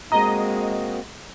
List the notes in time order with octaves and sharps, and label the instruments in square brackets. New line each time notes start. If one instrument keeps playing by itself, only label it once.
[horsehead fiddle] G#3 [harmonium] A#3 C4 F#4 [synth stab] D#5 [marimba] A#5